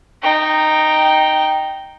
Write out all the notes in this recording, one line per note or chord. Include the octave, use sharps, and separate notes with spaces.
D#4 G5